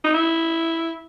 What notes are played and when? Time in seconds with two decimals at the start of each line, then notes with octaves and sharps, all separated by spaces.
0.04 D#4
0.15 E4